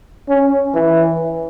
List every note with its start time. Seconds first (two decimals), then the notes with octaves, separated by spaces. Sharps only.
0.29 C#4
0.75 E3